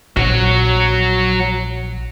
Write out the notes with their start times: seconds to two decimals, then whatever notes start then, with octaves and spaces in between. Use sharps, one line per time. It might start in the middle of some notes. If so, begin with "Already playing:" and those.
0.16 A#1 F#3 F#4